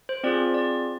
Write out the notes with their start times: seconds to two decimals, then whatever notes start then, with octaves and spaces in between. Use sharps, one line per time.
0.09 C5
0.24 C4 F4 G#4 D5
0.54 D5